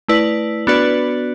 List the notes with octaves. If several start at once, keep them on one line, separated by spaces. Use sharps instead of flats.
A3 E4 B4 D5
B3 D4 F#4 B4 D5